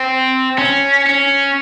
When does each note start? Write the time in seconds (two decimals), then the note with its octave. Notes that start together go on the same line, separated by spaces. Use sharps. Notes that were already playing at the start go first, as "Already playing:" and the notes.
Already playing: C4
0.58 C#4
1.06 C#4